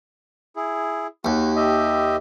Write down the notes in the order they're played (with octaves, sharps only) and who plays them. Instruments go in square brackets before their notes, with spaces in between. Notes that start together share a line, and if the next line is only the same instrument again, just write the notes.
[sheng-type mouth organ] E4 G#4
[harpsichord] D#2 [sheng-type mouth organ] F#4
[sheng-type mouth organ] G4 D#5 E5